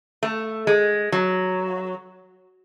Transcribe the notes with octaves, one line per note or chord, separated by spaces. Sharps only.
A3
G#3
F#3